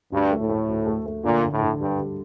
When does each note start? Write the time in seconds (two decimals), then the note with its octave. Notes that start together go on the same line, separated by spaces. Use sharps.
0.12 D2 G2
0.31 A3
0.40 A2
0.49 A3
0.68 D2
0.86 A3
1.06 A3
1.24 A#2 D3
1.43 D3
1.52 A2
1.62 D3
1.80 G2 G3
1.98 G3